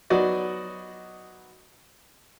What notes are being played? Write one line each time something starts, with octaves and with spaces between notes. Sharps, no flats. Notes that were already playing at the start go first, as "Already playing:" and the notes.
F#3 B3 D#4 F#4 D5 D#5